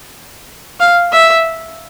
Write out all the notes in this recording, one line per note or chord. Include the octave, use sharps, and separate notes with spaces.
F5
E5